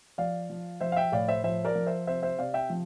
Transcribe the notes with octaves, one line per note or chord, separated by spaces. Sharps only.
F3 D5 F5
F3
F3 C5 E5
F5
E5 G5
A2 D5 F5
C5 E5
F3 C5 E5
A#4 D5
F3
C5 E5
C3 C5 E5
C5 E5
C3 D5 F5
E5 G5
F3